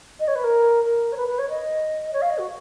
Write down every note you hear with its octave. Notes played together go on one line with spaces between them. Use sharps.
D#5
C#5
B4
A#4
A#4
C#5
B4
B4
C#5
D#5
C#5
F5
D#5
F#4